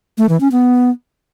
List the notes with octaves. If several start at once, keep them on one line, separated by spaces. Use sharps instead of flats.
A3
E3
C#4
B3